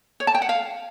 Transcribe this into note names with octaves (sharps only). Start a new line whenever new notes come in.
C#5
A5
G5
F#5
F5